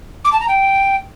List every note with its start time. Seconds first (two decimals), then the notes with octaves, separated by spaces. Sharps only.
0.25 D6
0.32 A5
0.40 A#5
0.48 G5